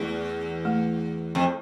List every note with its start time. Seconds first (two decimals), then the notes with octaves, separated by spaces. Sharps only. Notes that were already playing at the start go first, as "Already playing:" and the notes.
Already playing: E2 A3
0.65 A3
1.35 F2